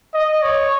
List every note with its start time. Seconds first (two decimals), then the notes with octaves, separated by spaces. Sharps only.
0.14 D#5
0.42 C#5